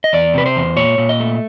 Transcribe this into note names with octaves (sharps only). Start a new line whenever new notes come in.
D#5
E2 D5
C3 B4
C5
E2
A#2 C#5
A#2
D#5
A3